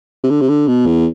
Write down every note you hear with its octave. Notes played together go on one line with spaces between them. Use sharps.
C3
D3
C3
D3
B2
E2